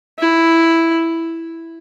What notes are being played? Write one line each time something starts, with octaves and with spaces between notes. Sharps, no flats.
E4